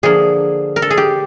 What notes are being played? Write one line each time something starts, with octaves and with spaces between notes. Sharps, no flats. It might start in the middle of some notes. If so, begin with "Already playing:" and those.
D3 F3 A#3 G#4
A#4
A4
G#4
G4